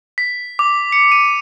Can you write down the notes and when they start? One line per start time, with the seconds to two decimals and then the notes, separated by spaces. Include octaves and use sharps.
0.18 B6
0.59 D6
0.92 C#7
1.12 D#7